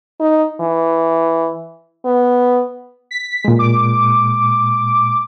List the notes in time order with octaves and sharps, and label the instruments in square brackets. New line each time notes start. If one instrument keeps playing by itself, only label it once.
[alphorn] D#4
E3
B3
[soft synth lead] B6
[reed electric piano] A#2 G#3
[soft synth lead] D6